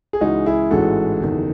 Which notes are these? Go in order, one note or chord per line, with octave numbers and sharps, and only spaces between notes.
G#4
C#2 C#3 E3 G#3 D#4 F#4
E4 G#4
A1 G#2 E3 G#3 F#4 A4
F#1 E2 D#3